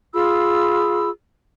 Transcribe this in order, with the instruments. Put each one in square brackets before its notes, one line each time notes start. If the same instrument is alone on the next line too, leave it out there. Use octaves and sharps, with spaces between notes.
[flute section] F4 G#4 B5 E6